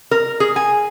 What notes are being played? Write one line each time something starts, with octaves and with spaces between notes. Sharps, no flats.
A#4
G#4
G#5